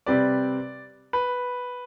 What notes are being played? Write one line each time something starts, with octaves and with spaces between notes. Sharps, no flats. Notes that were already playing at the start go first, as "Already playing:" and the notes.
C3 G3 C4 G4 B4 D5
B4